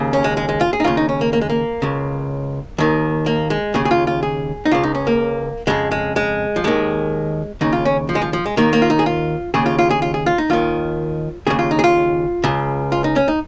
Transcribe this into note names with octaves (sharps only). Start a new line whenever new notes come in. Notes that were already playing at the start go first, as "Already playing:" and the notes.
Already playing: D#2 C#3
C#4
G#3
G#3
G#3
F4
G#4
D#4
D#2 C#3 F4
D#4
C#4
A#3
A#3
G#3
A#3
C#2 C#3
D#2 D#3
A#3
G#3
D#2 C#3 G#4
G#4
F4
F4
G#4
D#4
C#2 C#3 F4
D#4
C#4
A#3
F2 C#3 G#3
G#3
G#3
F3
D#2 D#3 G#3
D#2 C#3 D#4
F4
C#4
F3
G#3
F3
F3
G#3
D#2 D#3 A#3
A#3
F4
D#4
G#4
F4
D#2 C#3 G#4
F4
F4
G#4
F4
G#4
F4
D#4
D#2 D#3 F4
D#2 C#3 G#4
F4
D#4
G#4
F4
C#2 C#3
F4
D#4
C#4
D#4